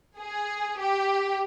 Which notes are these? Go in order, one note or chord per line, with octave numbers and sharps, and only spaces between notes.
G#4
G4